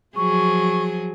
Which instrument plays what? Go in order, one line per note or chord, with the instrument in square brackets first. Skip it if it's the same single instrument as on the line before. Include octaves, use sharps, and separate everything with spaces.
[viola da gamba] F3 F#3 G#4 [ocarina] C#6